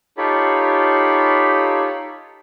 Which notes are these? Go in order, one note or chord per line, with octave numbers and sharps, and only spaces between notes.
D#4 F4 G4 A4 C#5 B5